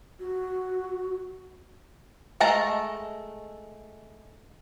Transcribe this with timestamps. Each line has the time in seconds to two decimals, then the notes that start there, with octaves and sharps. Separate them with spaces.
0.20 F#4
2.40 G#3 A3 A#4 A5 A#5